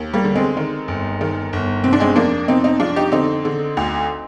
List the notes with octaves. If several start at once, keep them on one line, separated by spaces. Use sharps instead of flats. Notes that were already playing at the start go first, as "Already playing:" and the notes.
Already playing: D#2
G3 A#3
D3
G#3 C4
D#3
G1
D#3
G1
C3 C4
D4
G#3 C4
F2 A#3 D4
C3 C4 D#4
C4 D#4
F2 D4 F4
D#4 G4
D3 C4 D#4
D3
D2